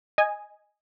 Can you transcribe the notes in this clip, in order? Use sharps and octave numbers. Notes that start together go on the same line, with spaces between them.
D#5 G#5